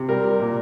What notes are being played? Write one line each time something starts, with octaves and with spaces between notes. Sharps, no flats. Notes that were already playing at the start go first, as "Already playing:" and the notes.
Already playing: C3
G3 A#4
G3
A#2